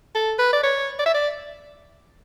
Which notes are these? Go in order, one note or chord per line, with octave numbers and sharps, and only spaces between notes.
A4
B4
D5
C#5
D5
E5
D5